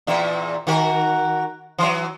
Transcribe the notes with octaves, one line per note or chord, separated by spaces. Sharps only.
E2 A#2 E5
D#3 F#4 A#4
E3 F#3